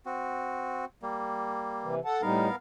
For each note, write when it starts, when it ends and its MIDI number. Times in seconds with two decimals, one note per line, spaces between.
0.06 0.85 60
0.06 0.85 66
1.02 1.95 55
1.02 1.95 58
1.83 2.00 48
1.83 2.00 52
2.05 2.21 69
2.05 2.21 78
2.05 2.21 81
2.22 2.49 45
2.22 2.49 55
2.22 2.56 59
2.22 2.49 63
2.22 2.56 70
2.22 2.56 77